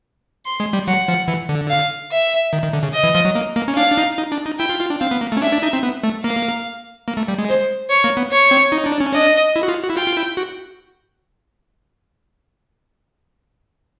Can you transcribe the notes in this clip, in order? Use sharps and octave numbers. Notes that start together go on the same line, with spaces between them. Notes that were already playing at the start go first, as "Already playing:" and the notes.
C6
G#3
G3
F#3 F#5
F3
E3
D3
F5
E5
D#3
D#3
D3
C#3
D#5
E3
F3
F#3
A#3
A#3
C#4
D4 F5
D4
D#4
D#4
D4
D#4
E4 G5
F4
F4
D4
C4 F5
B3
A#3
A3
C#4
D4 E5
D4
D#4
C4
B3
A3
A#3 F5
A#3
A3
G3
G#3
C5
C#5
A#3
B3
C#5
C4
D#4
D4
C#4
D4 D#5
E4
F#4
F4
F#4
E4
F4 G5
F4
E4
F#4